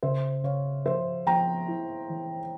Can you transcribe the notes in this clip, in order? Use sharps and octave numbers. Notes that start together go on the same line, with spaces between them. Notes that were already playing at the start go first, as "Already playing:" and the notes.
C#3 C5 E5
C#3 C#5 F5
F3 C5 E5
F3 G5 A#5
E4
E3